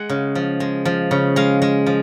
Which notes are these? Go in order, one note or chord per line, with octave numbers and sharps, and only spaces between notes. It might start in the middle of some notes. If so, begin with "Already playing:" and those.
Already playing: G#3 F#5
C#3
F3
G#3
F3
C#3
G#3 F5
G#3
F3